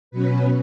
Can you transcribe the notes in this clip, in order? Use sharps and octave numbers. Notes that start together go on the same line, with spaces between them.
B2 F#3 C#4 B4